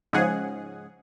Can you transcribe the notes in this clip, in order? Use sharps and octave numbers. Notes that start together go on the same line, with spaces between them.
G#2 C#3 F3 G#4 F#5